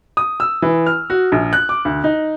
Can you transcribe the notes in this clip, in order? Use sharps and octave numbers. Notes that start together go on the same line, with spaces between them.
D#6
E6
E3
F6
F#4
A#1
F#6
D6
D2
D#4